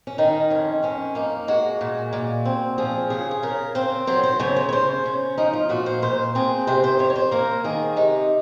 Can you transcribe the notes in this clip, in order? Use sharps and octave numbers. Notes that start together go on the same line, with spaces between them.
C#4
D#3 D#4
F2 C#4
F2 C#4
A#3 D#4
G#3 F#4
A#2
A#2
C4
F3 G#4
C#3 G#4
G#4
C#3 A#4
C4 C5
F#3 C5
C5
C#3 C#5
C#5
C#5
C#3 C5
C#4
F3 D#4
F4
A#2 F#4
C5
A#2 C5
C4 G#4
C3 C5
C5
F2 C#5
C#5
C5
A#3 A#4
D#3 G#4
C3 D#4